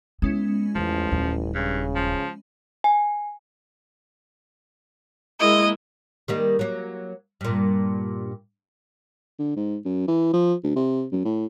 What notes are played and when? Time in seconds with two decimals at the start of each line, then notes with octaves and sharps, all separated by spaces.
0.22 G#3 B3 C#4 E4
0.75 A1 E2 F3
1.12 D#1 G3
1.55 G2 C#3
1.95 F3
2.84 G#5
5.40 G#3 A#3 E4 D#5
6.28 D#3 G3 A#3
6.59 F#3 A#3
7.41 G2 A#2
9.39 D3
9.56 G#2
9.85 F#2
10.08 E3
10.33 F3
10.64 D2
10.75 C3
11.12 F#2
11.25 A2